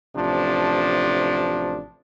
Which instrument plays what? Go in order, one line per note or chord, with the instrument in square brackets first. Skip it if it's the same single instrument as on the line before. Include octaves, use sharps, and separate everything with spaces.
[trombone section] A1 C3 F3 D4